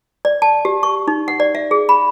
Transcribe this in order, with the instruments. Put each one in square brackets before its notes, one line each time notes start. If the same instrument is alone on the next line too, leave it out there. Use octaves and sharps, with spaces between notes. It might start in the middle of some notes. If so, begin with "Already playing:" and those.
[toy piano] D5
A5
G4
C#6
D#4
F#5
D5
E5
G#4
B5